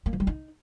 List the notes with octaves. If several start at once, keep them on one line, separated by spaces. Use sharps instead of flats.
A#3
F3
G3
D#4